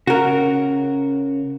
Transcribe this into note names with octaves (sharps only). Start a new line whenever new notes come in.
C#3 F#4 A#4